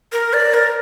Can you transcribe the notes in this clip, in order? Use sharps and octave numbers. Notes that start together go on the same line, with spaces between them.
A#4
D5
A#4